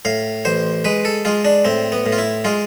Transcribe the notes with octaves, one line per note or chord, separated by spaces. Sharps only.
A2 F5
A1 C5
G#3 B4
A4
G#3 F4
D4
A2 C4
B3
A2
F4
E4
G#3 F4